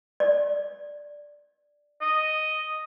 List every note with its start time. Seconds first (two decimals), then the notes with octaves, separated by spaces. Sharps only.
0.20 D5
2.01 D#5